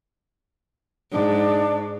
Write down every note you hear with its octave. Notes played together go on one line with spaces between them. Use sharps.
G#2 D4